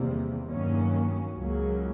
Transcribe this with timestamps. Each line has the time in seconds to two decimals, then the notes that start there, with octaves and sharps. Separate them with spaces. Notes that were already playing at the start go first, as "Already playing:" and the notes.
Already playing: E2 C3 D#3 G3 A#3
0.47 G2 D#3 F#3 A#3 C#4
1.36 C#2 C#3 F#3 A#3 C#4